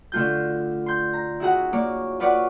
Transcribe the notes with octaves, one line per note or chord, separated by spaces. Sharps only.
D3 A3 F4 G6
C6 G6
A#5
E4 F#4 G#4 F#5
A#3 C#5 D5
F4 B4 C#5 D5 F#5